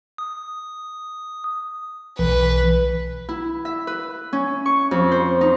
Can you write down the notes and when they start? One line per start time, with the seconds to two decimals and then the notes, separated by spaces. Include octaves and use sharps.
0.18 D#6
2.19 B1 E3 B4
3.29 E4
3.65 E5
3.87 B4
4.33 C#4
4.66 C#6
4.91 F2
5.12 C5
5.41 D#4